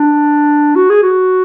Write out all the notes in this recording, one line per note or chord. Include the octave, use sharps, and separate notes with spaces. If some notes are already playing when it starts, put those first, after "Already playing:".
Already playing: D4
F#4
G#4
F#4